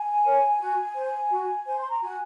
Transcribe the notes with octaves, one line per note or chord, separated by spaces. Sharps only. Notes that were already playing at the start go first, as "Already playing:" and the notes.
Already playing: G#5
A#4 C#5
F#4
C5
F#4
C5
C6
A#5
F#4 G#5